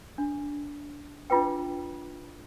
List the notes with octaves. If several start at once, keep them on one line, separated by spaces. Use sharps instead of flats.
D4
D4 E4 F4 G#4 B4 G5